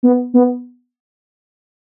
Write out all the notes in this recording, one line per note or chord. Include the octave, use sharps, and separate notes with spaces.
B3
B3